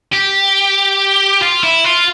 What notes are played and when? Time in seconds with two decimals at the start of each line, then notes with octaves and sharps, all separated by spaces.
0.14 G4
1.42 F4
1.64 E4
1.85 F4